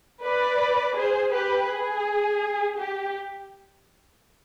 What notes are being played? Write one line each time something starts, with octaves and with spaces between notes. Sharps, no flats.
B4 D5
G#4 C5
G4 B4
G#4
G4